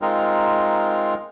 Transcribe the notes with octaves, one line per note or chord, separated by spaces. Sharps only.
G#3 C4 D#4 F4 A#4